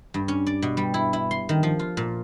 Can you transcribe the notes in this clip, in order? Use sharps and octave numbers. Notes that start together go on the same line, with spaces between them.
G2
C#4
D5
B2
G3
E4
E4
C6
D#3
F3
F4
A#2